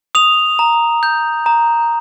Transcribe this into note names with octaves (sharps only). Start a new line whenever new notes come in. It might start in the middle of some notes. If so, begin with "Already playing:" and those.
D#6 F7
A#5
G6
A#5